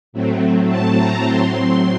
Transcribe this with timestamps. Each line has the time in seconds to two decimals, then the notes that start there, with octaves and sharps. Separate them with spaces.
0.13 A2 F#3 A3 C4
0.69 A5
0.98 A#5
1.25 A2 F#3 C4 C6